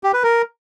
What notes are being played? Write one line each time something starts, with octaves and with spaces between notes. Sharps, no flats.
G4
B4
A#4